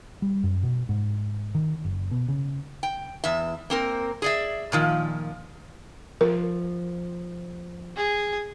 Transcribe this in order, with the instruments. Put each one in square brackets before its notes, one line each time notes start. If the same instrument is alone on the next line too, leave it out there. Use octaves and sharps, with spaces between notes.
[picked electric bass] G3
F#2
B2
G#2
D#3
F#1
B2
C#3
[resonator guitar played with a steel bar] G5
E2 E5
A#3 C4 A#4
G#4 D5 E5
A#2 D#3 F3
[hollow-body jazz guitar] F3 [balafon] A#4
[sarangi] G#4